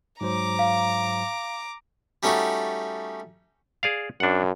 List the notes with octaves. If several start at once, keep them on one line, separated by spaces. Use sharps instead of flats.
G#2 F#3 C5 A#5 D6
F5
G3 A3 C#4 D#4 F#4
G#4 D5 F5
F#2 D4 F#5